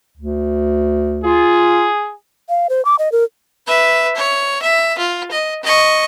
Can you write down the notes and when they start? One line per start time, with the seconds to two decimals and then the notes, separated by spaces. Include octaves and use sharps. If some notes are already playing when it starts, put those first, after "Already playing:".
0.17 D2
1.24 F4 G#4
2.49 F5
2.69 C5
2.85 D6
2.99 D#5
3.12 A#4
3.67 B4 E5
4.16 C#5
4.62 E5
4.98 F4
5.31 D#5
5.63 D#5 C#6